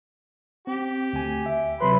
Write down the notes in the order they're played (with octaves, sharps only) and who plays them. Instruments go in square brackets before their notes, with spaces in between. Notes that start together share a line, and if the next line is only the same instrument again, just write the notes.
[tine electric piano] C4 [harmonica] G4
[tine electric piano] D2 G#5
E5
[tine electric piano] C3 F#3 B4 [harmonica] B5 C6